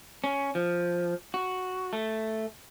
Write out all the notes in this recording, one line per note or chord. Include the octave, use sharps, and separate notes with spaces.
C#4
F3
F#4
A3